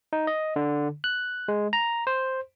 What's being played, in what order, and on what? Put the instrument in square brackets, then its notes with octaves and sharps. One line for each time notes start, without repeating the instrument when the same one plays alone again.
[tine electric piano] D#4
D#5
D3
F#6
G#3
A#5
C5